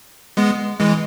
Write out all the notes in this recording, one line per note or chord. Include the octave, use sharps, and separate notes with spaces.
G#3 B3
E3 G#3